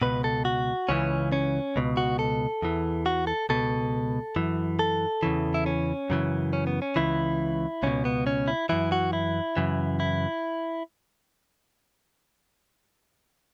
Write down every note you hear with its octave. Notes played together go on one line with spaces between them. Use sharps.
C#2 B2 B4
A4
F#4
C#2 C#3 E3 C#4
C#4
C#2 B2
F#4
A4
E2 E3
F#4
A4
C#2 B2 A4
F#2 E3
A4
E2 C#3 E3
E4
C#4
F#2 C#3 E3
C#4
B3
C#4
C#2 C#3 E3 E4
C#2 B2 C#4
B3
C#4
E4
F#2 E3 E4
F#4
E4
F#2 C#3 E3
E4